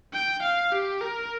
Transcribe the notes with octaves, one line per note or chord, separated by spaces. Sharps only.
G5
F5
G4
A#4